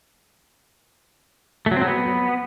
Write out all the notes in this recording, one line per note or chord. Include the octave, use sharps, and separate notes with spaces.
A3
F#3
C4
F#3
B3